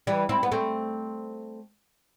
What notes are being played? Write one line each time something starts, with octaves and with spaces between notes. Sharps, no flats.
E3 G3
C4 E4
B3
A3 C4